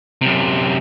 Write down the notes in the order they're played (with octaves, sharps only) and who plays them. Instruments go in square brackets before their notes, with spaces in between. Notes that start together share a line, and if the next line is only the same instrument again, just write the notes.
[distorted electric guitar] F#2 C3